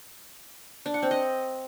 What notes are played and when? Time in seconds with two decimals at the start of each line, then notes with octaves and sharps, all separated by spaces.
0.86 D4
0.94 F#5
1.02 C4
1.11 D#5